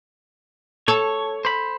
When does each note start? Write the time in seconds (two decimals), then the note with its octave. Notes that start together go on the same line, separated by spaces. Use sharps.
0.88 A4 C#5
1.45 C5 B5